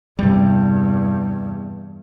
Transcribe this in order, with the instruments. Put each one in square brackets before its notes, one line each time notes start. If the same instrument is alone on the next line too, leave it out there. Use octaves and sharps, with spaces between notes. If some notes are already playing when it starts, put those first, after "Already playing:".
[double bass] E2 G2 [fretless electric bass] C3 G3